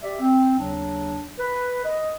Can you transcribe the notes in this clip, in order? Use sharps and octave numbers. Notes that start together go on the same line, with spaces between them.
G4 D5 E5
C4
D#2 C#3 F#3 D4
B4
D#5